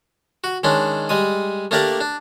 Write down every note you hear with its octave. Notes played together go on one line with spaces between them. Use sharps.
F#4
D#3 G#3 C#4 D4
G3 G#3 D#6
A3 A#3 D4 G4 A#4 D5
D4